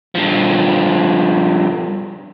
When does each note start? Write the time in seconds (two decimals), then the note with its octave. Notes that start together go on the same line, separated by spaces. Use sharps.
0.15 G2 F3